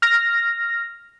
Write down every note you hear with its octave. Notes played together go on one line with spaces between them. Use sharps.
F6 A#6